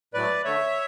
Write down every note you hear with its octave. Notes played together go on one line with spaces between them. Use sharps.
A2 F#3 A3 B4 D5
D3 A3 C#5 E5